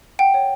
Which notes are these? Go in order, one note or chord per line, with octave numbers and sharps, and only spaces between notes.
F#5 G5
C#5